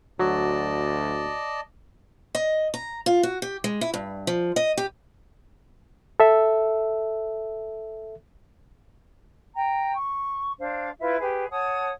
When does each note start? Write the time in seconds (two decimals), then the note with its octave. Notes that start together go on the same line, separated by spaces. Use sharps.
0.20 D2 F#3 F#4 D5 D#5 A5
2.35 D#5
2.74 A#5
3.06 F4
3.23 F#4
3.42 G4
3.64 G#3
3.81 E4
3.94 G2
4.27 F3
4.56 D#5
4.77 G4
6.20 A4 E5
9.54 G5 A#5
9.93 C#6
10.58 D4 C5 F5
10.98 E4 F4 B4 E5
11.19 G4 G#4 B4
11.50 C#5 F#5 A5 D#6